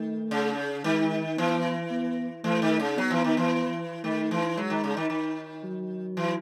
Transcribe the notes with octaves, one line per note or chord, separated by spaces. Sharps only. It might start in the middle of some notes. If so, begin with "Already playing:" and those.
Already playing: D#3 A3
C#3
D#3 G#3
E3 B3
B3
E3 A3
D#3
C#3
F#3 B3
E3
D#3
E3
D#3 A3
E3
F#3 G#3
D#3
C#3
D#3
D#3
F#3
E3